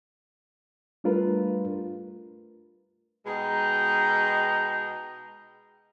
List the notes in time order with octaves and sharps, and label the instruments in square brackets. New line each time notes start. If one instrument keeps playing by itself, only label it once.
[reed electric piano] G3 A3 D4 F4 A#4 B4
[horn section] B2 G#3 D#4 G5 A#5